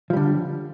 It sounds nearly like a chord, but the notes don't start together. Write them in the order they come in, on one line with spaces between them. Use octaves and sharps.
F3 G3 D3